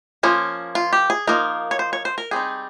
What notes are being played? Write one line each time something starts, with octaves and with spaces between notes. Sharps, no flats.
F3 A#3 C#4
F4
G4
G#4
F3 A#3 D#4 A#4
C#5
C5
C#5
C5
A#4
G3 C4 D#4 G#4